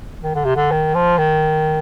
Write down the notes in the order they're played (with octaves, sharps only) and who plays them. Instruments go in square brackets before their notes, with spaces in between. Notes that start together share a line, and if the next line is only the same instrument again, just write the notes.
[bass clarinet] D#3
D3
C3
D3
D#3
F3
D#3